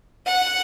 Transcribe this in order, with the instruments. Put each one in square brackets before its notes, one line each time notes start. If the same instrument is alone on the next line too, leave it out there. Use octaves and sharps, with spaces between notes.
[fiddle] F#5